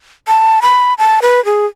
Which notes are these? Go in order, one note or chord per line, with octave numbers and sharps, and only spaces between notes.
A5
B5
A5
B4
G#4